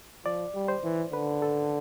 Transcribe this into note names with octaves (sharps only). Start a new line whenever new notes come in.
F3 D5
G3
C5
E3
D3 B4
A4